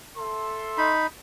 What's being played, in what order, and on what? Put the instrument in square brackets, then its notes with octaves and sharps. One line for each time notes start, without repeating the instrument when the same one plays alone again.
[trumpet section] A4 E5 C6
[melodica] D#4 B5